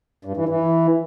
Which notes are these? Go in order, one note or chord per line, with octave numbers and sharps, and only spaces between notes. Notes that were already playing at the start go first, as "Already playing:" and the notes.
G2
E3
E3